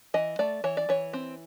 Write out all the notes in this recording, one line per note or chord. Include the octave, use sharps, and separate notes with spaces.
E3 D#5
A3 D5
E3 C#5
D5
E3 C#5
C4